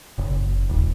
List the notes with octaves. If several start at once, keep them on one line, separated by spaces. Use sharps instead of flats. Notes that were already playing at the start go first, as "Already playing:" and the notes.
F#1
D#1